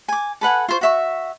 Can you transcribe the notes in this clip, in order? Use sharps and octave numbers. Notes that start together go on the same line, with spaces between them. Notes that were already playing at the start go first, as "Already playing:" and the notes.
G#5 D6
A4 B4 F#5 G#5
F4 C5 C#6
F#4 E5 C#6